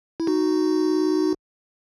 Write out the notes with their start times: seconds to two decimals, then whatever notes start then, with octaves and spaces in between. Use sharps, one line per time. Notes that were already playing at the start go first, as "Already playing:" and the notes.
0.20 E4
0.27 D#4 F#4